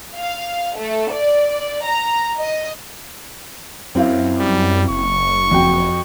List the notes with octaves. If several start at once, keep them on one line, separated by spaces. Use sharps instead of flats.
F5
A3
D5
A#5
D#5
F#2 C4 E4 F5
G3
F#1 C#6
F2 F#4 G5